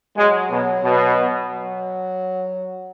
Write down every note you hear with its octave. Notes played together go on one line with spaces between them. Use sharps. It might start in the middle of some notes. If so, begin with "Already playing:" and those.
F#3 G#3
B2
B2
F#3